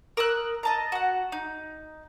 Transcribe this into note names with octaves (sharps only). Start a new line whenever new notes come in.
A#4 D#6 E6 F#6
D#5 A5 A#5
F#4 F#5
D#4